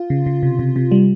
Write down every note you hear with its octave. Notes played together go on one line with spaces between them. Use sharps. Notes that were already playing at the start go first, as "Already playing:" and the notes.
Already playing: F4
C#3
C#3
C3
C3
C3
G3